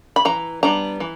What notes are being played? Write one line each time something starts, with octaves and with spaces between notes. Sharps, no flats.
B5
E3 A#5
G3 B3 D4 A#5
E3